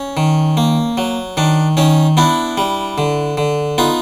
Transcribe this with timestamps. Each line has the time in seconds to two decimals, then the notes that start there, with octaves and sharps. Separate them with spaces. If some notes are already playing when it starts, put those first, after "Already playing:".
Already playing: C#4
0.17 D#3
0.57 A#3
0.97 F#3
1.37 D#3 D4
1.77 D#3 C#4 D#4
2.17 B3 D4 E4
2.58 G3
2.98 D3
3.37 D3
3.78 B3 D#4 F4